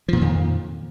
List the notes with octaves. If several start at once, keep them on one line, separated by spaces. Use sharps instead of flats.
F2 A#2 D#3 F3